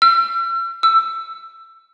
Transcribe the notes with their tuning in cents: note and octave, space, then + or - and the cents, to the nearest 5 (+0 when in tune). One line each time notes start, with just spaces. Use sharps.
E6 +45
E6 +15